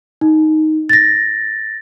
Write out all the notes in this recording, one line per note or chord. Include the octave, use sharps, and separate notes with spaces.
D#4
A6 A#6